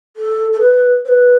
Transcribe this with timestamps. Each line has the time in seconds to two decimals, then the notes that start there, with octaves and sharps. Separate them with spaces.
0.17 A4
0.52 A4
0.60 B4
1.05 C5
1.08 B4